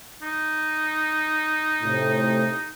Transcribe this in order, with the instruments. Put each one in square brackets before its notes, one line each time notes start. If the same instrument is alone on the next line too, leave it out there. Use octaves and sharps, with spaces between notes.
[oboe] D#4
[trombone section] A2 C3